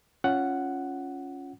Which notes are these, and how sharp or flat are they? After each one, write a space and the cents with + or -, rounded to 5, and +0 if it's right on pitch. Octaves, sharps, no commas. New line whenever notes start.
C#4 +0 F4 +0 F#5 +5